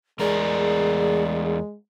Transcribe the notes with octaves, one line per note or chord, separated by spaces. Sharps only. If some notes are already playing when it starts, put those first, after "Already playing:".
E2 G#3 G#4 A#4 D5